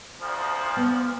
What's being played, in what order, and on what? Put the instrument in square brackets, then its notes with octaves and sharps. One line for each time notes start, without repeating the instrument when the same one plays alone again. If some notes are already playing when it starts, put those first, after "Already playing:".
[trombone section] D2 F3
[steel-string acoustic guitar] B3